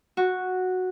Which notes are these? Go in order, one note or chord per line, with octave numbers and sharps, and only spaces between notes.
F#4